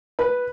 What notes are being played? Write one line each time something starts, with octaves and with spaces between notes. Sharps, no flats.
B4